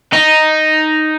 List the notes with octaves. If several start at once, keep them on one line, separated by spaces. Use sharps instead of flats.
D#4